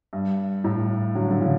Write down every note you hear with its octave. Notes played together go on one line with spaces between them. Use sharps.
G2
A2
D3 F#3
D3
C#3 E3